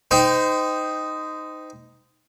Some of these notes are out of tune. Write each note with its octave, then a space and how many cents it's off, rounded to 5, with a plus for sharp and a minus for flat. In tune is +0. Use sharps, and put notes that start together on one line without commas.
D#4 +0 C5 -30 G5 +0